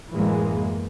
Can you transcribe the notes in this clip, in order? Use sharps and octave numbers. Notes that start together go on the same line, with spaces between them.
F#2 A2 E3 G#3 A#3